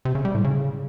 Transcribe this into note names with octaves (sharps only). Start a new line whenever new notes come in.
C3
C#3
G3
A2
C#3